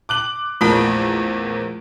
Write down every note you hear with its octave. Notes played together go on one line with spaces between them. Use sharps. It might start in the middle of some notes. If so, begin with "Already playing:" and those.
D6 F#6 F#7
A#1 E2 A3 A#3 F4 A5